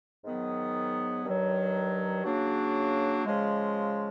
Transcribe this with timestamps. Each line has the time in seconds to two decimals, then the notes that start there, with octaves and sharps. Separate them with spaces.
0.24 G#2 D#3 F#3 B3
1.25 G2 D#3 F#3
2.25 C#3 F#3 A#3 D4 F#4
3.25 C#3 F3 G#3